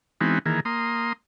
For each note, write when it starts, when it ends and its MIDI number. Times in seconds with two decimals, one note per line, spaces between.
0.21 0.39 52
0.21 0.39 56
0.21 0.39 59
0.21 0.39 60
0.21 0.39 63
0.21 0.39 66
0.46 0.60 51
0.46 0.60 52
0.46 0.60 58
0.46 0.60 68
0.65 1.13 58
0.65 1.13 84
0.65 1.13 87